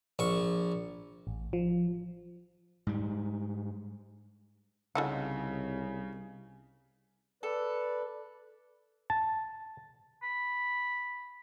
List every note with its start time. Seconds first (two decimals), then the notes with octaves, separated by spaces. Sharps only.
0.19 A#1 C#6
1.27 A1
1.53 F3
2.87 G#2 G3
4.95 C2 C#3 D#4 F4 A4 F#5
7.43 A4 B4 D5
9.10 A5
10.23 B5